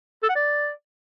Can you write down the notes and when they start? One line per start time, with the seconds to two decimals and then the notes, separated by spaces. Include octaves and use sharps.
0.23 A4
0.29 F#5
0.35 D5